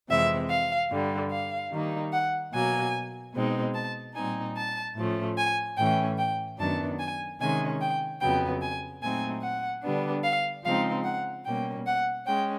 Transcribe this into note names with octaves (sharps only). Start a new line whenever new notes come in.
F2 C3 E3 G#3 C4 E5
F5
G2 D3 G3
F5
D#3 G3 A#3 D#4
F#5
B2 F#3 A#3 G#5
B2 G#3 C4 D#4
A5
A#2 G3 C4 D#4 G#5
A5
A2 F3 A3 C#4
G#5
A2 E3 A3 C#4 G5
G5
F#2 D#3 F#3 B3 D4 A5
G#5
C3 D#3 G#3 C#4 G#5
G5
F2 C#3 F#3 B3 G5
G#5
A#2 F#3 A3 C4 D#4 G#5
F#5
D3 G3 B3 D4
F5
C#3 F3 G#3 C4 D#4 F5
F#5
B2 G3 A#3 C#4 G5
F#5
G#3 C#4 G5